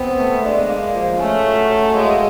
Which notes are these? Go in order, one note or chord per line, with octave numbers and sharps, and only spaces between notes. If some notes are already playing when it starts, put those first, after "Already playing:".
Already playing: B3 C4
A3
G#3 D4
A#3
F3
A3 C#4
F#3
F#3
G#3 A#3